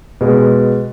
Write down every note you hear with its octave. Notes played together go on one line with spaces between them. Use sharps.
B2 G#3 B3